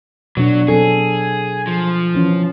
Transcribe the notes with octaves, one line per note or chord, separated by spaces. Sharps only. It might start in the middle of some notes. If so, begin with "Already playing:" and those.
B2 F#3 D4
F#3 C4 G#4 A4
F3
E3 C#4 E4